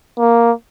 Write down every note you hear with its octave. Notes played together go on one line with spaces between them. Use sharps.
A#3